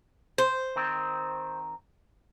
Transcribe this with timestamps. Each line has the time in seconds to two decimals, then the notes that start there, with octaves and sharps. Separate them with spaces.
0.38 C5
0.76 D#3 C4